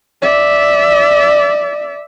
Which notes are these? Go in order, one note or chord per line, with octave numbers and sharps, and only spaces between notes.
D5 E5